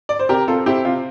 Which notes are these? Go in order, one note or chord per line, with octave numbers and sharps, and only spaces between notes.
D5
C5
C3 G4 A#4
C4 F4 A4
C4 E4 G4
C3 F4